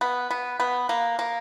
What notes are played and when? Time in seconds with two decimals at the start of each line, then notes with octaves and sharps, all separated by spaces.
0.01 B3
0.31 B3
0.60 B3
0.89 A#3
1.19 A#3